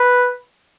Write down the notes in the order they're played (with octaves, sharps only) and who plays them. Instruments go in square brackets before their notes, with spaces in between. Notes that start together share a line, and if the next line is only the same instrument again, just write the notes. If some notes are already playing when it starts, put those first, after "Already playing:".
Already playing: [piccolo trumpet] B4